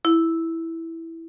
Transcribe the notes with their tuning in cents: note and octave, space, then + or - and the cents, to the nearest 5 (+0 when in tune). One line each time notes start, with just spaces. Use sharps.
E4 -5